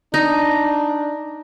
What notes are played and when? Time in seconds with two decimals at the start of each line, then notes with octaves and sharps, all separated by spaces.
0.14 D4 D#4